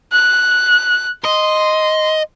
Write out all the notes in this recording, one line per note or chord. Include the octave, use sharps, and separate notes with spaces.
F#6
D#5 C6